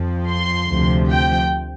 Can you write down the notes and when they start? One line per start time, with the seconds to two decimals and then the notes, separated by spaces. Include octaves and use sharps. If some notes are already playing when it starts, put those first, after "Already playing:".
Already playing: F2 F3
0.29 C6
0.69 D2 C3 F3
1.10 G5